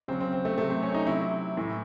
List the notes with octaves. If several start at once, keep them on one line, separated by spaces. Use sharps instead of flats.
C#3 F#3 C4
C4
C4
A3
C3 F#3 A3
C4
C#4
D#4
C3 F#3 E4
A2 E3